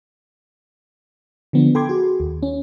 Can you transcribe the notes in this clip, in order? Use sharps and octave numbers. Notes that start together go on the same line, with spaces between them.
D3 F3 B3 D4
A4 G5 B5 C6 D6 G#6
F#4 G#4
D#2
C#4